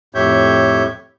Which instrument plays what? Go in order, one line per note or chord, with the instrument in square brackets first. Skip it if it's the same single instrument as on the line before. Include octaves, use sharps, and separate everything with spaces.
[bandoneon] F2 A2 G4 C#5 E5 G6